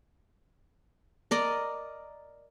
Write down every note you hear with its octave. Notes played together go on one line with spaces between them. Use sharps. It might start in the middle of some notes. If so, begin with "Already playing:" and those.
A#4 D5 D#5